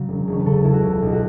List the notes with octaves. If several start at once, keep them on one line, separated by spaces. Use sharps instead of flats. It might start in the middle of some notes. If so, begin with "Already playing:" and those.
Already playing: C#3 F#3
E1
E1 C#5
B4
C#3 A4
C#2 E4
F#4
C#2
B1
F#4